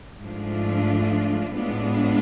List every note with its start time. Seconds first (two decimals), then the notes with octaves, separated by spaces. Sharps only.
0.21 G#2 F3 A3 D4 F4
1.55 A2 G#3 B3 D4 F4